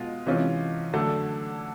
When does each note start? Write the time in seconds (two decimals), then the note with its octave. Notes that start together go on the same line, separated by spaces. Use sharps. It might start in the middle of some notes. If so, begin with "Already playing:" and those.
Already playing: B2 G#3 F4
0.26 C3 E3 G#3 C#4 F4
0.93 D3 F#3 A3 D4